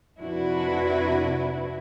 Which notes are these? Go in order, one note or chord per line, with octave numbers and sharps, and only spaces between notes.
F2 C3 D4 E4 F#4 B4